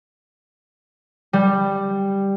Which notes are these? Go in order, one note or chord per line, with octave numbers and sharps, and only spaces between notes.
G3